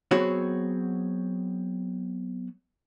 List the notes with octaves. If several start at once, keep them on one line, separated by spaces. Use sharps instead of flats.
F#3 B3 C4 F#4 G#4 C#5